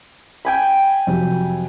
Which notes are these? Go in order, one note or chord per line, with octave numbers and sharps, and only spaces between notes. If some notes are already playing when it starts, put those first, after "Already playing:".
G5 G#5 B5
F2 C3 F#3